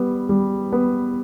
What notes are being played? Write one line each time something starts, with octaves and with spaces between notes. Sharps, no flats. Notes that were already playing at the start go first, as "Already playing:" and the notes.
Already playing: G3 B3
G3
B3